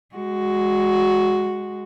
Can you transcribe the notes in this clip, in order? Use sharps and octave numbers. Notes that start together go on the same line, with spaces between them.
G#3 F#4